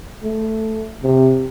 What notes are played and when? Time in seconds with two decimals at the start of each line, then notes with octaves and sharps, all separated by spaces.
0.23 A3
1.03 C3